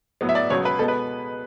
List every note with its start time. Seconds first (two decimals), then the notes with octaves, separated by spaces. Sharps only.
0.21 A2 F#3 B3
0.29 E5
0.35 D5
0.50 C#2 B2 F#3 B3 C#5
0.65 B4
0.79 B2 G#3 B3 A4
0.88 B4